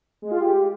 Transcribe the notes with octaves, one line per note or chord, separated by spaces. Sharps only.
G#3
F4
G4